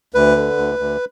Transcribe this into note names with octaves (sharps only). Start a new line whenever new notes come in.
D2 B4
D3
D2
D2